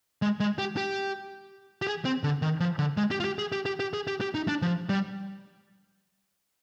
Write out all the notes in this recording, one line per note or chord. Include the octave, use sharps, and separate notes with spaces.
G#3
G#3
G4
G4
G4
G#4
C4
D3
D#3
F3
D3
G#3
G4
F4
G4
G#4
G4
G4
G4
G#4
G4
G4
D#4
D4
F3
G3